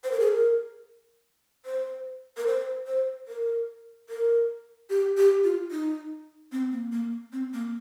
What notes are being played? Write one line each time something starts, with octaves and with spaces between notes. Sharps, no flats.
C5
A#4
G#4
A#4
C5
A#4
C5
C5
A#4
A#4
G4
G4
F4
D#4
C4
A#3
A#3
C4
A#3